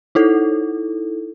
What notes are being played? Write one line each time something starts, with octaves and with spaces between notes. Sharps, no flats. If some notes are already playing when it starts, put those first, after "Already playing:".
D#4 E4 A4